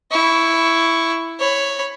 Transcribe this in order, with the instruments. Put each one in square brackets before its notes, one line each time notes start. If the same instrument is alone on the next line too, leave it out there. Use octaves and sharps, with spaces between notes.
[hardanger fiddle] E4 C#6
C#5 B5